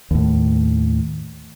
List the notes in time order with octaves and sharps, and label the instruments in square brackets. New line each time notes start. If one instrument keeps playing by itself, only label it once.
[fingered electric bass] D#2 A2